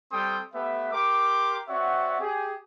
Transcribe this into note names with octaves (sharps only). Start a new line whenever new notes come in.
G3 C4 A4 G5 C6 D#6
A3 B3 G4 B4 E5
G4 A#4 C6 D6
C4 F#4 C#5 D5 E5 F#5
G4 G#4